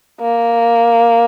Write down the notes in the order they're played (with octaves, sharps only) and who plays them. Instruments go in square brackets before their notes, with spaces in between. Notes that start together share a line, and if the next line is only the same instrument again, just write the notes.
[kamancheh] A#3